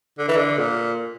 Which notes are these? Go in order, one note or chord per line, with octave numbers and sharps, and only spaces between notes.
D3
E3
D3
A#2